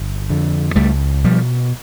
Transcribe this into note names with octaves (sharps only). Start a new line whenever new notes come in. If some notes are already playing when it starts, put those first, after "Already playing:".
Already playing: G1
F2 D3
C#2 G3 A3
B2 F3 G3